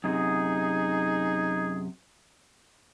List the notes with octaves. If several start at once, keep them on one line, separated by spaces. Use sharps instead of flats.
F#2 C3 D#4 G#4